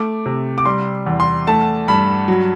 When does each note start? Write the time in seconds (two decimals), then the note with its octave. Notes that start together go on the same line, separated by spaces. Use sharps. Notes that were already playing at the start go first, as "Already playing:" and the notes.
Already playing: A3 D6
0.26 C3
0.58 D6
0.65 G3 C6
1.06 E2
1.20 C6
1.47 A3 A5
1.88 G2 B5
2.28 F#3